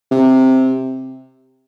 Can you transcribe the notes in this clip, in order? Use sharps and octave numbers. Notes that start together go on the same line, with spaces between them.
C3